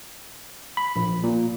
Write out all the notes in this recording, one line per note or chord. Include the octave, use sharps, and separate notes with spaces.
B5
A#1
A#2